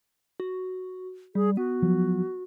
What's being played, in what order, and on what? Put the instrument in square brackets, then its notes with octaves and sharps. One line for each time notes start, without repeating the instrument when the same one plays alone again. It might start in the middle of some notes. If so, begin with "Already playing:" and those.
[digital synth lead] F#4
[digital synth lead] G3 [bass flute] G#4
[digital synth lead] B3 [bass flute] F#4
[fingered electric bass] F3 F#3